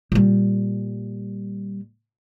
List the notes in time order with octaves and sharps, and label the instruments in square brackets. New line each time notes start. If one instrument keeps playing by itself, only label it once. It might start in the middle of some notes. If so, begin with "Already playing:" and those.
[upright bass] A#2 G3